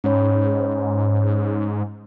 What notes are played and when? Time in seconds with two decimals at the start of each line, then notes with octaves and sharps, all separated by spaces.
0.04 G#2 C#4 C#5 B5